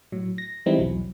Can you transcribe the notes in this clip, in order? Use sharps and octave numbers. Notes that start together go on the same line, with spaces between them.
A2 F#3
A#6
E3 G3 G#3 C4 D#4 E4
B1 E2 F#3